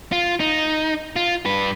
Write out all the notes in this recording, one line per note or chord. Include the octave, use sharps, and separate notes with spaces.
F4
D#4
F4
G2 B4